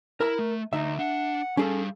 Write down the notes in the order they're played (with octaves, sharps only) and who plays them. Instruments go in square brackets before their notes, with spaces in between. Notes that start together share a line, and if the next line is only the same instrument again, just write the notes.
[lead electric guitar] E4 [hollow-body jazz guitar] A#4 A#5
[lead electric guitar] A3
[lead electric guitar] D2 [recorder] D#4 [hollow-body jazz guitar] E5
[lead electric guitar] D4 [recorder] F#5
[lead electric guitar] G3 F5 [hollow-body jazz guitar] C#4 G#4 A4